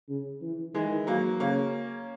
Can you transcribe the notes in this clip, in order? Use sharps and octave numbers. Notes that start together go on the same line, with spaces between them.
C#3
E3
D#3 E3 G#3
F#3 A#3
C#3 A#3 C#4